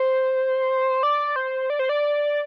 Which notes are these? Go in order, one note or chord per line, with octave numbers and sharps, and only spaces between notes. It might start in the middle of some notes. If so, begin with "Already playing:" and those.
Already playing: C5
D5
C5
D5
C5
D5